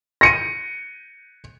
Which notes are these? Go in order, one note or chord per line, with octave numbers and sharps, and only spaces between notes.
A#6 C#7 D#7